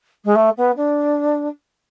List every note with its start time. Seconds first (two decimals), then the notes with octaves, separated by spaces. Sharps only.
0.24 G#3
0.35 A3
0.57 B3
0.76 D4